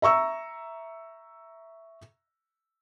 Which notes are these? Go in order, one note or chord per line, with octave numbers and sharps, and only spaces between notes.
E5 A#5 C#6 E6